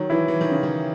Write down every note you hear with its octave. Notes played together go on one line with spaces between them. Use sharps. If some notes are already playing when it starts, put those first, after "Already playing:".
Already playing: D#3 F#3
E3 E4
E3
D#3
C#3 C#4
D#3